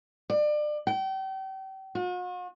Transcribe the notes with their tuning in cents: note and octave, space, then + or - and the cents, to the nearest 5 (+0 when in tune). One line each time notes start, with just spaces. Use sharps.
D5 +30
G5 -35
F#4 -45